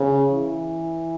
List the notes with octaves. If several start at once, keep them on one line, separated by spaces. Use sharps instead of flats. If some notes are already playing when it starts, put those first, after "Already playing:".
Already playing: C#3
E3